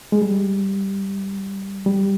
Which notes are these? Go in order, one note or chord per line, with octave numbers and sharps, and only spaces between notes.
G#3
G3
G3